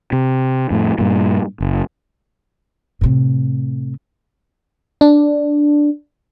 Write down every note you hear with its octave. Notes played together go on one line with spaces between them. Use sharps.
C3
F2 A2
G2 A#2
F#1
A2 C3
D4